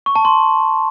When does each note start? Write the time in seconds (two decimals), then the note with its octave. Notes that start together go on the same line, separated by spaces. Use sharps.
0.06 C#6
0.15 A5
0.25 C6